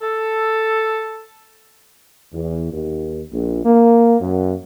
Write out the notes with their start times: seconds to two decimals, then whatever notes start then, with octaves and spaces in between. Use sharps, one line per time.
0.02 A4
2.33 E2
2.71 D#2
3.32 A#1
3.65 A#3
4.21 F#2